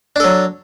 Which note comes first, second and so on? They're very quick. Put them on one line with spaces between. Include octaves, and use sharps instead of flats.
D4 A4 F#3